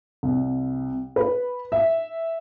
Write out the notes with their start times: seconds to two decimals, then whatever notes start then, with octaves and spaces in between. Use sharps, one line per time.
0.23 C2
1.16 B4
1.72 E5